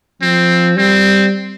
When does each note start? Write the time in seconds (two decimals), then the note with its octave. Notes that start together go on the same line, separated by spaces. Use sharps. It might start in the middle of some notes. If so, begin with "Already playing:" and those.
0.22 F3 C4
0.77 G3 C4